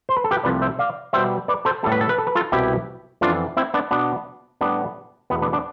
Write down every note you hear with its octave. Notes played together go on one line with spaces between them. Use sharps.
C5
B4
A4
G4 B4
C2 C3 F3 A3 B4 D5
C5 E5
D5 F5
B2 G3 B3 C5 E5
B4 D5
A4 C5
A2 G3 B3 A4
B4
A4
B4
A4
B4
F4 A4
C2 B2 G3 B3 E4 G4
F2 E3 B3 D4 F4
C4 E4
B3 D4
B2 B3 D4
A2 G3 B3 D4
E2 B2 A3 B3
B3 D4
B3 D4